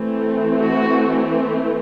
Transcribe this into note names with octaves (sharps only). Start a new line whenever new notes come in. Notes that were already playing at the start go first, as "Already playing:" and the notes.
Already playing: E3 A3 C4
F#4